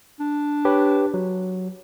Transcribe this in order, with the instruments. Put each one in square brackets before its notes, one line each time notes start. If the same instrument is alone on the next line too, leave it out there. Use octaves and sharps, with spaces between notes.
[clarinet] D4
[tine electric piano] G4 B4 C#5
F#3